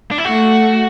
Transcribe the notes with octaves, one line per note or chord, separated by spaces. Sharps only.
D4
E4
A3 F#4